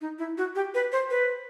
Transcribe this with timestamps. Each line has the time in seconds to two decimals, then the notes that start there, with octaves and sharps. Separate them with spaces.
0.01 D#4
0.19 E4
0.38 F#4
0.55 G4
0.74 B4
0.92 C5
1.10 B4